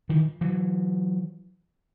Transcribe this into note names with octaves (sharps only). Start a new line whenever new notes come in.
D#3 F3
E3 F#3